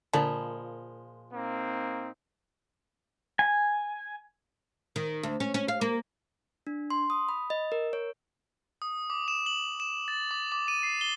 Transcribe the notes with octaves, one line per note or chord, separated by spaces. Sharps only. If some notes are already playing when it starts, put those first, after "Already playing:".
A#2 D3 F3 G#3 A5 B5
A#3 C4 D#4
G#5
D#3
D2
C#4
C#4
F5
A#3
D4
C6
D#6
B5
D#5
A#4
C#5
D#6
D6
E7
F#7
E7
A6
D6
D6
D#7
C7
G7